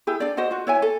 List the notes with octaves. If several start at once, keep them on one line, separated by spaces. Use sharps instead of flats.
E4 G4 G#4
D4 D5
F#4 C5 D#5 F#5
F4 F#4
E4 C#5 E5 G#5
A4